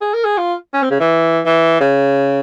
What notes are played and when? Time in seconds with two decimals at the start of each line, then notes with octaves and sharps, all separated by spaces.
0.01 G#4
0.14 A#4
0.25 G#4
0.38 F4
0.74 C#4
0.83 C4
0.91 C#3
1.00 E3
1.46 E3
1.81 C#3